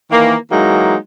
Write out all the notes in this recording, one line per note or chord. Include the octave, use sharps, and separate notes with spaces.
D#3 E3 A#3
E3 F#3 G#3 A#3 D#4